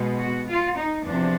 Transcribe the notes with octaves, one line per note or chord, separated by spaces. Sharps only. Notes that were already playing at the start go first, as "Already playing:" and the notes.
Already playing: B2 G#3 B3
F#4
F4
D#4
E2 C3 F3 D4